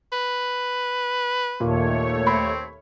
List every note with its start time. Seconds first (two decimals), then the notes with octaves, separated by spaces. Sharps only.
0.13 B4
1.60 D#2 A#2 A3 C#5
2.27 C4 B5